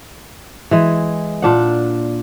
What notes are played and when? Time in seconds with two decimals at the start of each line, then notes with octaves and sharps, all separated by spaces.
0.71 E3 G#3
1.42 A#2 D4 F#5